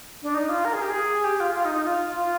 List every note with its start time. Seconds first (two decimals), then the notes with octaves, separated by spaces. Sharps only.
0.23 D4
0.34 D#4
0.49 F4
0.65 A#4
0.73 G#4
0.81 G4
0.90 G#4
1.24 G4
1.40 F4
1.55 F4
1.65 D#4
1.75 D#4
1.85 F4
2.15 F4